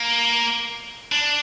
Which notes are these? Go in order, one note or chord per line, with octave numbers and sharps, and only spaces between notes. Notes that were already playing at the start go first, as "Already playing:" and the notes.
Already playing: A#3
D4